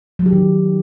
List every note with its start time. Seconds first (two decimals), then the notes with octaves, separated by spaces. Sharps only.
0.19 F#3
0.26 G4
0.33 D#3